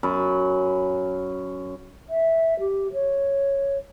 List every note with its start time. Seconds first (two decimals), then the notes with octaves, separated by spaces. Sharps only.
0.03 F#2 B5
2.10 E5
2.60 G4
2.93 C#5